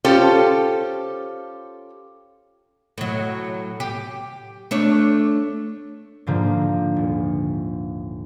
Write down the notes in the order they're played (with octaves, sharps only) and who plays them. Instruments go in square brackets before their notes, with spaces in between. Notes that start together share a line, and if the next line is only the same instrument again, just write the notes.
[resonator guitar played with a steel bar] C#4 F4 G4 A4 C5
[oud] A2 F#3
G4
A3 D4 C#5
[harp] G#2 D3 F3 A#3
D#1